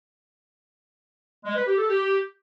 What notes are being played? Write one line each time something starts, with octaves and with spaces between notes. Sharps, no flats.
G#3
B4
G4
A4
G4